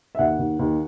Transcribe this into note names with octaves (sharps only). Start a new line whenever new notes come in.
E5
D#2 F#5
D#2
D#2